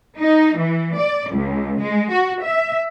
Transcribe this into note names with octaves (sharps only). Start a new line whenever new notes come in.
D#4
E3
D5
C#2
G#3
F#4
E5